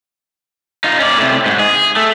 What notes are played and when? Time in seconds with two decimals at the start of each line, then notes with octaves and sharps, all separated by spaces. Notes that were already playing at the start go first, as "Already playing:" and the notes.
0.84 D#4 F4
0.99 C#4 D5
1.18 A2 C3
1.46 G#2
1.59 G#4
1.97 A3